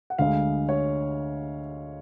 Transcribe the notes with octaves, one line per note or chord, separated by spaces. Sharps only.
F#5
D2 D3 G#3 F5
C#5